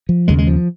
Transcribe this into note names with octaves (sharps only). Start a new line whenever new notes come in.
F3
D#2 C#3 G#3
G#3
F3